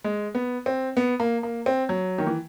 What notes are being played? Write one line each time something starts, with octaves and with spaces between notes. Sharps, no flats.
G#3
B3
C4
B3
A#3
A#3
C4
F#3
D#3
E3